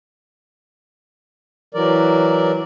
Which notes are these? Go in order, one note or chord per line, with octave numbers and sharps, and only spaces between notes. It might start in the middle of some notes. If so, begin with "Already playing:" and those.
E3 F#3 A#4 D5